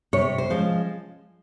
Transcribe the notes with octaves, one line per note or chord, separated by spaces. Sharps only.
C3 C#5
C5
F3 G#3 C#4